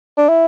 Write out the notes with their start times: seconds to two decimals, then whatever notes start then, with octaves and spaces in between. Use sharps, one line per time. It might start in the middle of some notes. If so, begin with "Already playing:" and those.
0.17 D4
0.29 E4